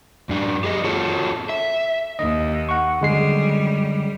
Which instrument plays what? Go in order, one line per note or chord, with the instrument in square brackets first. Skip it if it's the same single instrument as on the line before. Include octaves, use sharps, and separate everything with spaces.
[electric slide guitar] F#2 D4
G4 G#4 D#5
F4 F#4 A4 C#5
E5
[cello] D#2 [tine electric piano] D#5
[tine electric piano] F#5 C#6
[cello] F#2 G3 [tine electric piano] D3 G#3 C7